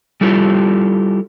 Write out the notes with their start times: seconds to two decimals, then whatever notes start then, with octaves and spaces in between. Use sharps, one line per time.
0.21 G3 E4 F4 G4 A4